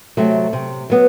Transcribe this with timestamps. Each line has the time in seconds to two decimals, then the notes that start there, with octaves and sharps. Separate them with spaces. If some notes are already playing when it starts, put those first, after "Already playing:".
0.17 C3 F#3 A3 C4
0.53 C3
0.90 F#3 B3